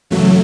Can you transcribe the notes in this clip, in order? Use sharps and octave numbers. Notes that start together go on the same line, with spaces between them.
F#2 C#3 E3 F#3 A3